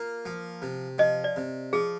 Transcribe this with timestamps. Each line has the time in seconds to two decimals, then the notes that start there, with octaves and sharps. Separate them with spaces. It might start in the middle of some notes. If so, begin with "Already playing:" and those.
Already playing: A#3 F4
0.25 F3
0.62 C3
0.98 F3 D#5
1.24 D5
1.36 C3
1.73 F3 G#4